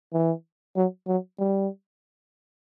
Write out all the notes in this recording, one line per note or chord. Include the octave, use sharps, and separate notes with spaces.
E3
F#3
F#3
G3